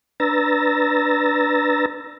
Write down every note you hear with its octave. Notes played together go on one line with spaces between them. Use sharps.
D4 B4 A#5 E6 A6 A#6